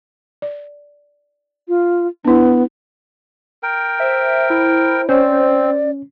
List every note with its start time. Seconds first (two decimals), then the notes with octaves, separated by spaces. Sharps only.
0.42 D5
1.68 F4
2.25 B3 D4 E4
3.63 A#4 G5
4.00 C5 E5
4.50 E4
5.09 C4 C#4 C5 D5